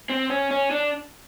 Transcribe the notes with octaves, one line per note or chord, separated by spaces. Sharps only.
C4
C#4
C#4
D4